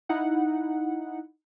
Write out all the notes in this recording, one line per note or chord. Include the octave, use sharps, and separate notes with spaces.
D#4 E4 F#5